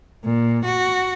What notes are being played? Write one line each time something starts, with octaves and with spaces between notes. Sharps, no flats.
A#2
F#4